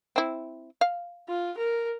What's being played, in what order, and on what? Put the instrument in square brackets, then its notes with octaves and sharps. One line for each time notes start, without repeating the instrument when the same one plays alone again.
[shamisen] C4 E4
F5
[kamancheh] F4
A#4